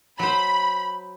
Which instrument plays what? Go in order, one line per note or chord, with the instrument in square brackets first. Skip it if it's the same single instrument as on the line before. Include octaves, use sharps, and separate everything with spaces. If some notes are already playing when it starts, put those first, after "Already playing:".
[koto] F#3 C5 [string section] B5